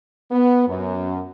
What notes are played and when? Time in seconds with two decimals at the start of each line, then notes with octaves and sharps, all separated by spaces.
0.31 B3
0.67 F#2